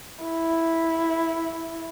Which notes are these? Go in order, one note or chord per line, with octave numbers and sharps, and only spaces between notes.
E4